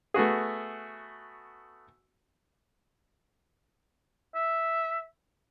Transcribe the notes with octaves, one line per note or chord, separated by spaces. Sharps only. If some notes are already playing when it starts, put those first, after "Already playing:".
A3 B3 F#4 G#4
E5